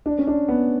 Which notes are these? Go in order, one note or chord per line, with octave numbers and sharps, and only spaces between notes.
D4
C#4
D4
B3